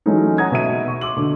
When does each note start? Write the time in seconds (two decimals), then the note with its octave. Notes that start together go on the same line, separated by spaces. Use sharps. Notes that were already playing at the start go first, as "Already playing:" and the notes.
0.06 E3 F#3 G#3 A3 C#4 D#4
0.38 F#5 A#5 D#6 G#6
0.52 B2 E5 D#7
0.88 C#6
1.01 C6 D6 E6 F#7
1.16 B2 D3